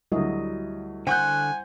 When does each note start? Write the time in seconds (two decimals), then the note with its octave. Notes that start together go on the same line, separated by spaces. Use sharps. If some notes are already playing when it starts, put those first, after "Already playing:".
0.12 D2 F#3 G3 E4 D#5
1.07 D3 C5 F#5 G#5 C#6 F#6 G6